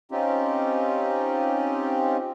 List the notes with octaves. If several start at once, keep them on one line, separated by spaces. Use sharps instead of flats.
C4 C#4 D#4 F4 G4